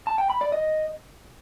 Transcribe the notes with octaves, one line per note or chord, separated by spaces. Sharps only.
A5
G5
B5
D5
D#5